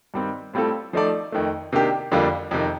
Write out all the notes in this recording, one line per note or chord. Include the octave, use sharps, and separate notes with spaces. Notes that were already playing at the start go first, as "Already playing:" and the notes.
G2 D#3 G3 C4
A2 G3 C4 F4 A4
F3 A3 D#4 A4 D5
F2 D#3 A3
C3 D#3 A#3 D4 G4
F2 D3 G3 A#3 F4
F2 C3 D#3